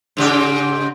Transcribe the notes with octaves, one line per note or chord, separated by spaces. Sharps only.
G#2 C#3 G4